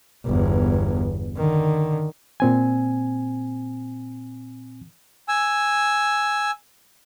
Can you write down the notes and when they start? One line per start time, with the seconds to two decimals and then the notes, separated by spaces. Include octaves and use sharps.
0.25 G1 E2
1.37 D3 D#3
2.40 A#2 C4 G#5
5.28 G#5 E6